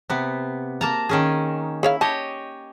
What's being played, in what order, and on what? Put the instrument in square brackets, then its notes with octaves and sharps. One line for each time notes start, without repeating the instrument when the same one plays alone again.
[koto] C3 B3
A#3 A5 A#5
D#3 C#4 G#4
[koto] E4 [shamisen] G#4 C#5 F5
[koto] G4 C#5 D#5 [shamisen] A5